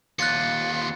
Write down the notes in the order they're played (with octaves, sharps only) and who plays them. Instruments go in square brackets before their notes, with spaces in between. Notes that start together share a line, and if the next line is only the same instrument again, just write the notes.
[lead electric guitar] D#2 F4 [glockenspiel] F#6 A6 C#7